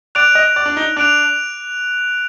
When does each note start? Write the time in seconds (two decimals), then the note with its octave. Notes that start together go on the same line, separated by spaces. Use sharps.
0.15 D5 F#6 D7 F7
0.35 D#5
0.56 D5
0.66 D4
0.77 D#4
0.97 D4 F#6 D7 F7